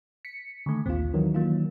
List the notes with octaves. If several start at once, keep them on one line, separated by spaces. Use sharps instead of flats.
B6 C#7
D3 D#3 A3
A#1 D#2 C4 F4
D#3 E3 F#3
A#3 F4